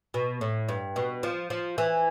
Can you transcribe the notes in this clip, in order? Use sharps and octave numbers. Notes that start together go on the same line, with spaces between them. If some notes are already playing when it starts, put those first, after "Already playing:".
B2
A2
G2
B2
F3
F3
E3